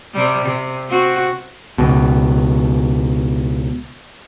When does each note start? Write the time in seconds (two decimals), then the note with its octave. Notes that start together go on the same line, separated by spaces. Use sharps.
0.14 C3 G3
0.45 C3
0.89 C4 F#4
1.78 C#2 B2